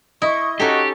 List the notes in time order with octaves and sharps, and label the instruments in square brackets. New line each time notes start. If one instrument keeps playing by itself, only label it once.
[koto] E4 [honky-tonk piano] D#5 [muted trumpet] C#6
[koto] C#4 D#4 A4 [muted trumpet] F#4 [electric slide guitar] G4